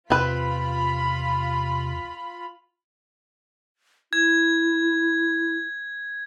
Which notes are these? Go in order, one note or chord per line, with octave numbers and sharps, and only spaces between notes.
E2 C3 C4 F4 B4 B5
E4 G#6